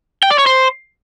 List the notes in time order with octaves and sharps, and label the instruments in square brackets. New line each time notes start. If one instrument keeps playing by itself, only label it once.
[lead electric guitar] G5
D5
C#5
C5